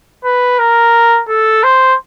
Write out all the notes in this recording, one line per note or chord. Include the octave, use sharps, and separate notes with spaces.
B4
A#4
A4
C5